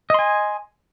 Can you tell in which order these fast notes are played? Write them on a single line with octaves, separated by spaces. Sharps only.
D#5 C6 G#5